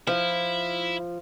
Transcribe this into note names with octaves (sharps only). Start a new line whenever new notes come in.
F3 E4